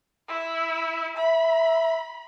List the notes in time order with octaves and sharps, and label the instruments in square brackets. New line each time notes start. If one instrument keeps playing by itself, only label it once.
[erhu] E4
[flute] E5 [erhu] B5